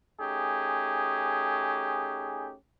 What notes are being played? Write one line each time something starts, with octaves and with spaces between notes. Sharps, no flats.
A3 C#4 D#4 G4 G#4